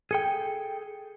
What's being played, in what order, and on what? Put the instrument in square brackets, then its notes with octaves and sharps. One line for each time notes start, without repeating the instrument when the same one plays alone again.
[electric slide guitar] G#4 A4 G5